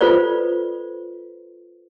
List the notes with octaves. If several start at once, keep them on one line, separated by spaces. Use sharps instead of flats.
F4 A4 B4 C5 D5